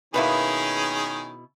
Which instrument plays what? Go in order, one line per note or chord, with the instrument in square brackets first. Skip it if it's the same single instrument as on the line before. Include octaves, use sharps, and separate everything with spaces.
[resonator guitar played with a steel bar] B2 E4 [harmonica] D#3 C#4 G#4 [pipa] A#3 B3 B4